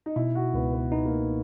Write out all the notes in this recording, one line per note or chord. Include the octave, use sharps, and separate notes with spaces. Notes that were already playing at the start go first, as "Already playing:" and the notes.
D#4
B2 E4
F#4
C#2 B3
B3
B3 D#4
A#3